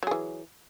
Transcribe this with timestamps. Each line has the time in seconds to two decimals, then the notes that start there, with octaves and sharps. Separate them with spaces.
0.03 F#3
0.07 G#4
0.11 E3